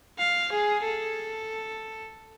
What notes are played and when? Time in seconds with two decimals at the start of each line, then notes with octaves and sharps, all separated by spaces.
0.19 F5
0.52 G#4
0.84 A4